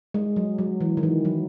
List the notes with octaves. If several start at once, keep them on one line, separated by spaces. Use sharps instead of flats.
G#3
F#3
F#3
E3
D#3
E3
F#3